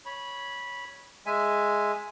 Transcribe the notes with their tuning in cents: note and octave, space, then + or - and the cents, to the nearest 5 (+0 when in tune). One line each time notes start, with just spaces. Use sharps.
C#5 +0 B5 -15
G#3 +0 E5 +5 G#5 +0